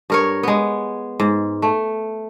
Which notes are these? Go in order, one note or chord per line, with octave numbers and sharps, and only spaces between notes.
G2 A#4 C#5
G#3 B3
G#2
A3